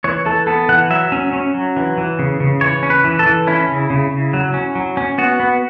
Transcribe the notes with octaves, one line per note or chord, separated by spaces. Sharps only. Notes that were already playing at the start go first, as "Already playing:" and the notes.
E3 C#5
E3 A4
B3 A4
E3 F#5
F#3 E5
C#4
C#4
F#3
E3
E3
C#3
C#3
E3 C#5
C#4
B4
E3
A4
E3
C#4 E4
C#3
C#3
C#3
F#3
C#4
F#3
C#4
B3 F#4
B3